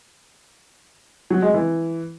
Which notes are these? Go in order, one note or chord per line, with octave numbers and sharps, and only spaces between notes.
F#3
G#3
E3